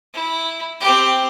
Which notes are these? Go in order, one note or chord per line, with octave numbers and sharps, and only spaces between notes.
E4
C4 G4